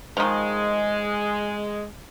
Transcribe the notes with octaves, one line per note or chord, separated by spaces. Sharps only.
D#3 F3 G#3